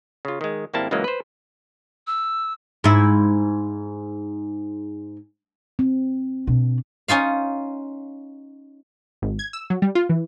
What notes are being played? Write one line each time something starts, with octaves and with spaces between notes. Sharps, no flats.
C#3 F4
D#3 G#3
G#1 G3 A#3 C4 E4 A5
C#2 C#3 E3 F#3 G#3 A#3
B4 C5
E6
G#2 E4
C4
B2 D4
C#4 D#4 F4 F5
G#1
G#6
E6
F#3
G3
F4
E3